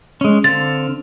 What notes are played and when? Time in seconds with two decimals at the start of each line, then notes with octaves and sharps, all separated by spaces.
0.21 G#3 C#4
0.44 D3 C4 F5 A6